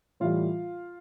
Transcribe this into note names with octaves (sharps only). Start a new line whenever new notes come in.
A2 E3 G3 F4 F5